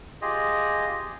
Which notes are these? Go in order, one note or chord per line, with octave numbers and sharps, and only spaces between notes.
F4 G4 G#4 D#5